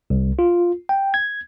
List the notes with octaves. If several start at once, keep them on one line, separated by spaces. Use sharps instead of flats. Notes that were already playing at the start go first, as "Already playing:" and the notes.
C2
F4
G5
G#6